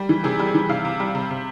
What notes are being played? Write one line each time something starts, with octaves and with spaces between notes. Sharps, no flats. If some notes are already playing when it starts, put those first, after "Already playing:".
Already playing: G3
E3
C3 G#4
G3
G#4
E3
C3 F5
C3
G3
C3
C3